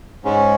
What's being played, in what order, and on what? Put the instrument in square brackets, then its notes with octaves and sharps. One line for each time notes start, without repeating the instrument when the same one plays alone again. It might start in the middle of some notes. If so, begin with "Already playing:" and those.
[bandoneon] G#2 G#3 C#4